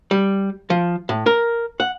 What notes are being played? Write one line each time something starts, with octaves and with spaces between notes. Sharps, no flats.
G3
F3
A2
A#4
F#5